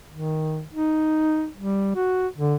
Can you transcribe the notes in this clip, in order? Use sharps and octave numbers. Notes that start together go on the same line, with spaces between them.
D#3
D#4
G3
F#4
D3